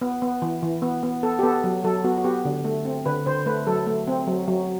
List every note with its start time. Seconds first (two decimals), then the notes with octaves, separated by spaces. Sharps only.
0.01 B3
0.22 B3
0.42 E3
0.63 E3
0.82 B3
1.03 B3
1.23 B3 A4
1.39 G4
1.43 B3 A4
1.64 F#3
1.84 F#3 A4
2.04 B3 F#4
2.18 F#4
2.24 B3 G4
2.45 D3
2.65 A3
2.85 C4
3.06 D3 B4
3.26 D3 C5
3.46 A3 B4
3.67 F#3 A4
3.87 A3
4.07 C4
4.27 F#3
4.48 F#3